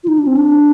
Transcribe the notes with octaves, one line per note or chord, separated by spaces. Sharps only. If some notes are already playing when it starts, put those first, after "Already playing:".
F4
D#4
D4
C4
D4